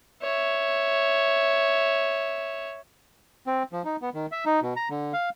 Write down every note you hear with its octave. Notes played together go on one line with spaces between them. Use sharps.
C#5 E5
C4
F3
D#4
B3
D#3
E5
D#4
B2
A#5
D3
F5